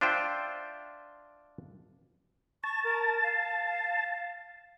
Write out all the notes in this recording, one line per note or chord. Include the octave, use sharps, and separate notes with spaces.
D4 F4 C5 E5 G5
A5 C#6
A#4
F5